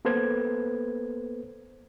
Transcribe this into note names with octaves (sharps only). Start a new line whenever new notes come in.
A#3 B3 A4 B4 C5 G#6